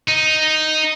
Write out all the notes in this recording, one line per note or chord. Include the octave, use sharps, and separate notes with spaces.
D#4